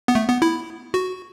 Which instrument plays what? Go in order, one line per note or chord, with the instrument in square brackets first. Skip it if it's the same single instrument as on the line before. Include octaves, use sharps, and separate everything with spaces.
[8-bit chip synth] B3
A3
B3
E4
F#4